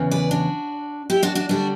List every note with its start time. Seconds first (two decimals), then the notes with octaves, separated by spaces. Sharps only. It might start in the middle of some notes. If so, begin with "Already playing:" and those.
Already playing: E2 C#3 E3
0.11 B4 D5
0.31 D4 F#4
1.10 E4 G4
1.23 D4 F#4
1.35 D4 F#4
1.49 D3 G3 D4 F#4